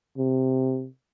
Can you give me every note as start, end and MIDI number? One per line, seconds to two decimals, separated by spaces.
0.18 0.87 48